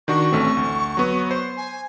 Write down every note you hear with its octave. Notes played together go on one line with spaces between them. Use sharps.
D#3 D4 F#4 C#6
A1 A3 C4
D2
F#3 B3
C5
G#5